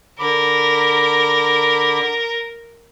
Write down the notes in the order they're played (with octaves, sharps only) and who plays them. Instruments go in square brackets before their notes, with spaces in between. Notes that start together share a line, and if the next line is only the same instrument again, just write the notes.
[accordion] D3 B5 D6 [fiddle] A#4